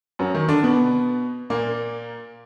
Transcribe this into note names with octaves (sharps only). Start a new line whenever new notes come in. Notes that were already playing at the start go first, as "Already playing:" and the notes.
F#2 F#3
D#3
D3 D4
B2 B3
A#2 A#3